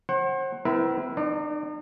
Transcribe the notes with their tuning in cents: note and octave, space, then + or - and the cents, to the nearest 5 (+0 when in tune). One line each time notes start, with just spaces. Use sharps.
C5 +40 F#5 +20
C4 -45 E4 +0 A#4 +40
D#4 -45 D5 +0